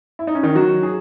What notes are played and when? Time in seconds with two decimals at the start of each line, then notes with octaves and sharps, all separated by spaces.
0.19 E4
0.27 D#4
0.35 C#4
0.43 D#3 D#4
0.55 F#3 F#4
0.83 G#4